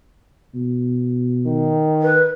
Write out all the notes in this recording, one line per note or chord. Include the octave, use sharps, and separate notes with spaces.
B2
D#3
B4